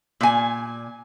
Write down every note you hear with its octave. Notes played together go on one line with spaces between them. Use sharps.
A#2 G#5